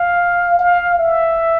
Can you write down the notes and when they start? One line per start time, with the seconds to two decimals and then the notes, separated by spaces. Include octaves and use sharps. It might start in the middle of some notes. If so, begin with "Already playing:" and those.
Already playing: F5
0.59 F5
0.99 E5